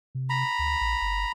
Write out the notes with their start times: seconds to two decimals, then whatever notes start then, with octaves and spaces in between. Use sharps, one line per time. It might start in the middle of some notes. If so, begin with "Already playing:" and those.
0.15 C3
0.30 A#5 B5
0.59 D2
0.81 A#1
1.02 G1